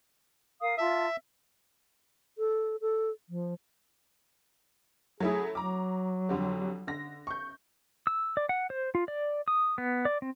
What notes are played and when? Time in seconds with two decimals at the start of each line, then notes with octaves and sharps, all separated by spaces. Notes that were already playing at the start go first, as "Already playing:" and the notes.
0.61 A#4 F5 D#6
0.78 F4 E5 A5
2.38 A4
2.81 A4
3.29 F3
5.20 F#3 A3 E4 G#4
5.55 F#3 A#5 D6
6.29 F2 D3 G3
6.87 D3 A#6
7.27 C#6 G6
8.07 E6
8.37 D5
8.49 F#5
8.70 C5
8.95 F4
9.08 D5
9.48 D#6
9.78 B3
10.05 D5
10.22 C4